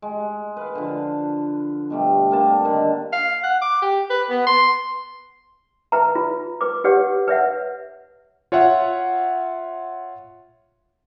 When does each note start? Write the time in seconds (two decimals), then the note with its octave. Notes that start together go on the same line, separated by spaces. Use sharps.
0.02 G#3
0.57 B4 F5
0.75 D3 F3
1.90 B2 G3 A3
2.31 D3 A#3 C4 A5
2.64 D3 D#3
3.13 F5
3.43 F#5
3.62 D6
3.82 G4
4.10 B4
4.30 B3
4.47 C6
5.92 B4 E5 A#5
6.15 F4
6.61 B4 D6
6.84 G4 B4 C#5 F#5
7.28 B4 C#5 E5 F#5
8.52 F4 C#5 E5 F#5